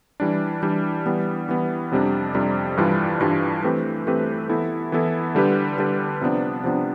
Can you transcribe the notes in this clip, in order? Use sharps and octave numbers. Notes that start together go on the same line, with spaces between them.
E3 G3 D4
E3 G3 D4
E3 G3 B3
E3 G3 B3
F2 C3 G3 D4
F2 C3 G3 D4
G2 E3 G3 D4 F4
G2 E3 G3 D4 F4
E3 A3 C4 G4 B4
E3 A3 C4 G4 B4
E3 B3 E4 A4
E3 B3 E4 A4
D3 G3 D4 G4 B4
D3 G3 D4 G4 B4
C3 F3 B3 D4
C3 F3 B3 D4